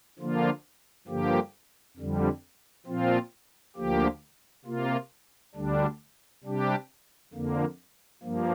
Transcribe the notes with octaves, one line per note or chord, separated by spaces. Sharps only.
D3 F3 A#3 F4
G2 D3 F3 A#3 G4
F2 D3 G3
A#2 F3 C4 F4
D2 D3 F3 A#3 G4
C3 A#3 F4
D2 D3 G3 D4
C3 G3 D4 G4
F2 D3 A#3
G2 F3 A#3